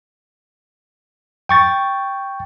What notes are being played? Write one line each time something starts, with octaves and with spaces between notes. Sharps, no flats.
G5 C#6 A6